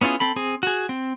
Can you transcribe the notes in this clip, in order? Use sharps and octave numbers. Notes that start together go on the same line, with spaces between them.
B3 C#4 E4 F4 G#4
C4 A4 B5
C4 G#4
F#4 G#4
C4